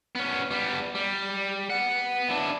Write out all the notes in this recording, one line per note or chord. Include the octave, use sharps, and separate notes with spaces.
B3 C#4
G3 B3
G3
B3 F#5
D4 E4